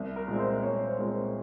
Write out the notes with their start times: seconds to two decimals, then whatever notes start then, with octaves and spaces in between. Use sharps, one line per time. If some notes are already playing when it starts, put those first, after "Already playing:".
Already playing: C2
0.16 A#4
0.28 A#2 G#3 C4
0.39 C5
0.63 C2 C#5
0.87 C5
0.99 A#2 G#3 C4
1.10 C5